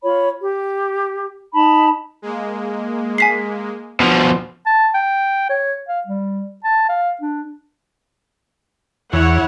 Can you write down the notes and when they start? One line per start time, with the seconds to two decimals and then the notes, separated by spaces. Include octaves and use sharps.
0.03 F4 C#5 B5
0.41 G4
1.53 D#4 A5 B5
2.22 G#3 A#3
3.18 G#5 B6 C7
4.00 B2 F3
4.66 A5
4.94 G5
5.50 C#5
5.88 F5
6.07 G3
6.64 A5
6.89 F5
7.21 D4
9.13 E2 E4 C#5 F#5